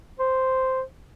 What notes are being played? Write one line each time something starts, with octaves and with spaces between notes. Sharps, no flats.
C5